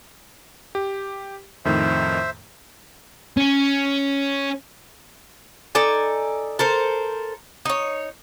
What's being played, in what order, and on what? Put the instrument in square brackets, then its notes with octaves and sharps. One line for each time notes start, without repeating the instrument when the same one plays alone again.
[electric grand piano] G4
[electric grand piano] F2 A2 D#3 [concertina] C5 E5
[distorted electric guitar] C#4
[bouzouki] D#4 A4 D5 G#5
A4 A#4 C5
D#4 C#5